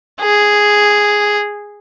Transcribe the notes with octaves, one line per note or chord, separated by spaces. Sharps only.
G#4